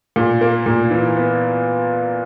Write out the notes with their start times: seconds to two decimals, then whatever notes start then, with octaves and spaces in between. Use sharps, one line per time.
0.16 A#2
0.41 A#3
0.66 A#2
0.91 E3
1.16 B3